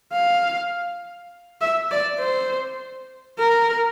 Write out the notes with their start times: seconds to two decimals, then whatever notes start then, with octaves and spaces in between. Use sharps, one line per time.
0.13 F5
1.61 E5
1.91 D5
2.20 C5
3.39 A#4